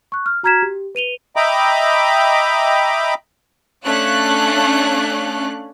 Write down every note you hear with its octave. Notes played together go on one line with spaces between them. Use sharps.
C#6 F#6
F6
F#4 A#5 F6 G#6 B6 E7
G4
B4 D#7 F7 G7
D#5 E5 G5 A#5 B5 D6
A3 C#4 D4 F5 F#6